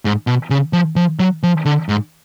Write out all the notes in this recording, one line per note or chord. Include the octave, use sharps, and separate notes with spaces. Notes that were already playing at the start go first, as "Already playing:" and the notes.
G#2
B2
C#3
F3
F3
F#3
F3
D3
G#2